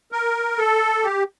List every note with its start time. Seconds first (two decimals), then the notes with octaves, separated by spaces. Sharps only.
0.12 A#4
0.58 A4
1.04 G4